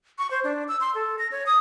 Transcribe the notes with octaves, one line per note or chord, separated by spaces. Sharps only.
C#6
C5
D4
E6
C6
A4
A#6
C#5
D#6